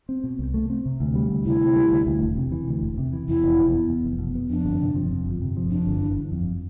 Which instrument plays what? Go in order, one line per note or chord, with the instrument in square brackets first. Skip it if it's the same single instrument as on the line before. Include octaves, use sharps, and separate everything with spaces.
[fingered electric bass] C4
B2
C2
A3
C4
C3
D2
G3
D2
[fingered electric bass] C3 [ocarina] E4
[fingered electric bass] D2
G3
D2
D2
E1
C3
E3
D2
E1
C3
E3
[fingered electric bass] E2 [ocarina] E4
[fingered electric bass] F1
B2
B3
E2
F1
B2
B3
[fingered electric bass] F2 [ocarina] D4
[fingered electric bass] G1
C3
F3
F2
G1
C3
F3
[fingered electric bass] F2 [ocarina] D4
[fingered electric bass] G1
E3
G1
F2